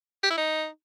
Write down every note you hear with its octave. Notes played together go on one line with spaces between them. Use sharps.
G4
E4
D#4